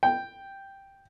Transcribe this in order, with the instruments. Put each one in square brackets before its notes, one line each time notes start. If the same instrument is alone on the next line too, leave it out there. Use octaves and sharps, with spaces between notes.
[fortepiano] G5